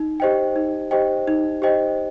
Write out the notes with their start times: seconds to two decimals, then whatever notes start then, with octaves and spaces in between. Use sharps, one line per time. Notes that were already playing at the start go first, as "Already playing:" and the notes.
Already playing: D#4
0.20 G4 C5 D#5 G5
0.56 D#4
0.91 G4 C5 D#5 G5
1.28 D#4
1.62 G4 C5 D#5 G5